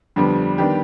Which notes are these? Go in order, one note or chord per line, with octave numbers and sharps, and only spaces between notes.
F2 D3 G3 B3
D#3 G3 B3 D4 G4